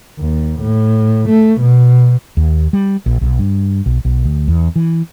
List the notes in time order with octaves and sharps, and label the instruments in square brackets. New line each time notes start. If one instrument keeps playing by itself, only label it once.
[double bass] D#2
A2
A3
B2
[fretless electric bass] D#2
G3
A#1
B1
G2
B1
B1
D2
E2
E3